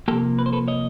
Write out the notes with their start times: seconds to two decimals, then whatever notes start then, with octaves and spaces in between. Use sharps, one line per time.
0.08 C3 F3 A#3 G4 A4
0.39 B4
0.46 C5
0.53 A4 B4
0.68 C#5 D#5